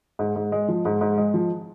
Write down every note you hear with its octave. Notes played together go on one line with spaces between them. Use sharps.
G#2
G#2
G#3
F3
G#2
G#2
G#3
F3